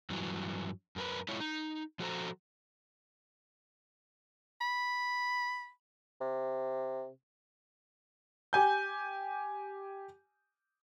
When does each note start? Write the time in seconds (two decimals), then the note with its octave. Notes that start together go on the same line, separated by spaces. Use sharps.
0.10 G2 E3 F#3
0.96 F#2 A#4 B4
1.29 G#3 E4 F4 C#5
1.40 D#4
1.99 F3 F#4 A4 C5 A#5
4.61 B5
6.21 C3
8.53 G4 G#5 G6